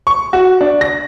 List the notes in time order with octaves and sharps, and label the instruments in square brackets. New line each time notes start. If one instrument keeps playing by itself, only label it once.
[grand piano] C#6
F#4
D4
A#6